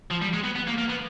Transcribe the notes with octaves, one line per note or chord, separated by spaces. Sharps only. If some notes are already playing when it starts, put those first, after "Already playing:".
F3
G3
G#3
B3
B3
A#3
A#3
B3